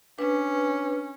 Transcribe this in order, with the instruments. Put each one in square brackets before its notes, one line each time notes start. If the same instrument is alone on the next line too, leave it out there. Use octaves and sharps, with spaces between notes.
[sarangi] C#4 [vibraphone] D4 B4